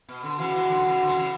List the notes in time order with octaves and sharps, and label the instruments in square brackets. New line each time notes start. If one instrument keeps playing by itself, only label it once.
[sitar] B2
D3
[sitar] C#3 E3 [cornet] F#4
[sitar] E3 G#3
D3 F#3
C#3 E3
D3
F#3
C#3 E3